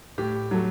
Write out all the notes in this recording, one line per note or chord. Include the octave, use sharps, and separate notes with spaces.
A2 G4
F#3 A3